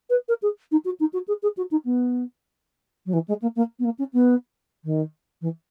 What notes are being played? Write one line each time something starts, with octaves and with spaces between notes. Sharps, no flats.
B4
A#4
G#4
D#4
F#4
D#4
F#4
G#4
G#4
F#4
D#4
B3
F#3
E3
G#3
A#3
A#3
B3
A#3
C#4
B3
D#3
E3